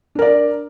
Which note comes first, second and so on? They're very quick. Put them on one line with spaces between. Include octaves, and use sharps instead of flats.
D4 A#4 D5